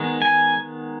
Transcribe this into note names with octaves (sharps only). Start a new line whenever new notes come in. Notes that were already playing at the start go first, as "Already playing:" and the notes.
Already playing: D#3 G#3 B3
G#5